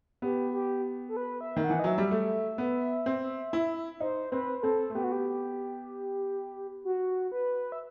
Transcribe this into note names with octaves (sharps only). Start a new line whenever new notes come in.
B3 G4
G4
A4
B4
E5
D#3
F#5
E3
D#5
F#3 E5
G3
A3
B3
C4
E4
D#4 C5
C4 B4
B4
C4 A4
A3
B3 G4
F#4
G4
F#4
B4
E5